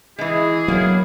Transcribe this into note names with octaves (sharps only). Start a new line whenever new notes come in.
E3 G#3 E4 G#4
F#3 A#3 B3